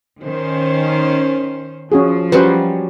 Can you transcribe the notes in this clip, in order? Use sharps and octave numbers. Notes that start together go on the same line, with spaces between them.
D#3 C#4 C5
F3 C#4 F#4 G#4
F#3 G3 C#4 B4 C5